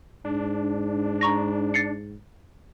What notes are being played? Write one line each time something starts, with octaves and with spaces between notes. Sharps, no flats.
G#2 D4
A#5 C#6 A#6
A6 C7 C#7